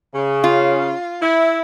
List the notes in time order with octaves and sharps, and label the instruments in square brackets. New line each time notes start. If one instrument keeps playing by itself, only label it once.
[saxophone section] C#3
[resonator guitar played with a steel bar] F4
[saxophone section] E4